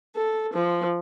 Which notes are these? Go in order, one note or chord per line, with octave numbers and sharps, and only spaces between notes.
A4
F3